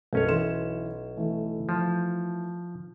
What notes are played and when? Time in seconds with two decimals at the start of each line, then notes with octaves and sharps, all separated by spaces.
0.13 B1 F#2 C#4 A4 A#4 C#5
0.28 E3 C6 E7
1.17 E3 A3
1.69 F3